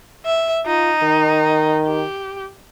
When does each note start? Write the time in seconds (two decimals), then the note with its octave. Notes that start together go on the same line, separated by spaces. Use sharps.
0.26 E5
0.67 D#4 F4
1.03 D#3
1.86 G4